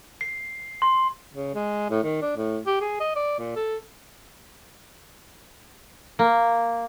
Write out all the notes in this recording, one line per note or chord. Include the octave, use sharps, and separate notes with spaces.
C7
C6
C#3
G#3
A2
D#3
D4
A2
G4
G#4
D#5
D5
A#2
A4
A#3